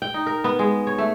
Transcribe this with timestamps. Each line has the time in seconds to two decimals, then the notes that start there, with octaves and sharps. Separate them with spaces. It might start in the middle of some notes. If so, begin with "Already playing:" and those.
0.02 G5
0.14 D#4
0.26 A#4
0.44 B3
0.59 G#3
0.87 C#5
0.98 A3